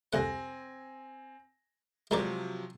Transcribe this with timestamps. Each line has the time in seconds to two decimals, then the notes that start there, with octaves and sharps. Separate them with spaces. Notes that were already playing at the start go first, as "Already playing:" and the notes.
0.13 C2 F2 C4 F#5 G#5 A#6
2.11 C3 F3 F#3 G#3 A#4 D5